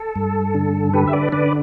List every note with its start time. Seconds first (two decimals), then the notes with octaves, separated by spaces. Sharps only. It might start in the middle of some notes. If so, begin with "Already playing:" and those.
Already playing: A4
0.16 G2
0.55 D3
0.93 D3 G4 B4
1.07 E5
1.13 B4 D5
1.32 D3 B4 D5